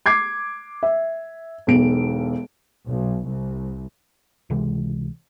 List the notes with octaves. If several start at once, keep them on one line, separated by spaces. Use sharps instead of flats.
D6 G#6 C7
E5
E1 B1 D7
B1
C2
C#2 C3 E3 G#3